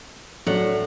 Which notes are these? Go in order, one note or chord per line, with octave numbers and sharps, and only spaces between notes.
A2 F#3 A3 D4 F#5